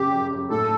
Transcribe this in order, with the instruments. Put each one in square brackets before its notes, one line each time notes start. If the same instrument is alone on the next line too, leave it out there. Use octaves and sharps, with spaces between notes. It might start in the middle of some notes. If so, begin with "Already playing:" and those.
Already playing: [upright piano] F#2 C#3 [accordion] G4
[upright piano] F#2
F#2
[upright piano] A2 [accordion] A4